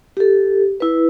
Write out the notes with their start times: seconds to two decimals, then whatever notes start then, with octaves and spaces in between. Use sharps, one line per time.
0.17 G4 A4
0.80 E4 B4